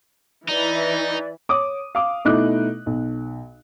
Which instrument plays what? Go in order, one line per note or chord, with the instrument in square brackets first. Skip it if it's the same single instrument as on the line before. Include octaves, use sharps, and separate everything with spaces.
[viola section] E3 [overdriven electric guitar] D#4 [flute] D5
[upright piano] C#5 D6 D#6
F5 D6
B2 A3 D#4 E4 D6 F#6
B1